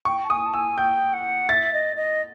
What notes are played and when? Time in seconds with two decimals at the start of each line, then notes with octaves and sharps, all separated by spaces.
0.05 G5 C#6
0.24 A5
0.30 G#5 D#6
0.46 A5
0.53 G#5 E6
0.77 G5 G6
1.13 F#5
1.49 E5 A6
1.73 D#5
1.96 D#5